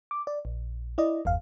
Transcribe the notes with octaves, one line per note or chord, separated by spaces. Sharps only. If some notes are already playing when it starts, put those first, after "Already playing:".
D6
D5
A#1
E4 D5 D#5
G1 E2 F5